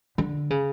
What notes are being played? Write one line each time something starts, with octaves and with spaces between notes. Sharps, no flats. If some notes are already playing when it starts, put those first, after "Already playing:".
D3
C#3